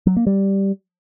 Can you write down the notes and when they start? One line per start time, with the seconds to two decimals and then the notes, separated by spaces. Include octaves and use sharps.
0.07 F#3
0.17 A#3
0.27 G3